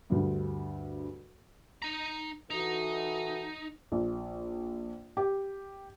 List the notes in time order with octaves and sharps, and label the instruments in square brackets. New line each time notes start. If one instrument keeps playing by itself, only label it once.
[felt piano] D2 G2
[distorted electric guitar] D#4 A#5
[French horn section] E3 F#4 A4 [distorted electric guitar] D#4
[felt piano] A#1
G4